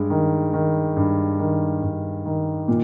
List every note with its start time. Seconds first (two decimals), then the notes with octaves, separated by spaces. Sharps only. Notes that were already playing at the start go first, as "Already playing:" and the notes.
Already playing: G2 G#3
0.10 D#3
0.53 D#3
0.97 G2
1.39 D#3
1.83 G2
2.25 D#3
2.68 A#2